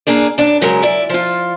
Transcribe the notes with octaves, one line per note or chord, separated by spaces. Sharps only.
A#3 D4 G#4 D5
F#2 D4 D5
C#3 F#3 G#3 A#4
E4 D5
F3 F4